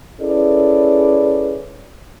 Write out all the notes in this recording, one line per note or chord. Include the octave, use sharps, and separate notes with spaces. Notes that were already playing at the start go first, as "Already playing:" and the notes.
C#4 E4 G#4 A4 B4 D5